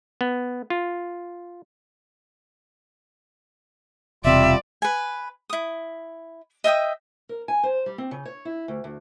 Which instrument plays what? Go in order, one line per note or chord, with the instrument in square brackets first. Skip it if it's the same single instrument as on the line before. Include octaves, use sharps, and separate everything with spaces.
[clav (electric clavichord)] B3
F4
[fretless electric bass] E1 C3 [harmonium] G3 F4 [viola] D5 [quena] E5
[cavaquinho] B4 G#5
E4 D#6
D#5 E5 G5 D#6
[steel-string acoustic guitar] A#4
G#5
C5
G3
C4
C#3
C#5
E4
D2
D2